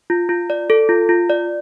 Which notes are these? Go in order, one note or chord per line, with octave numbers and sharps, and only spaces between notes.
F4
F4
D5
A4
F4
F4
D5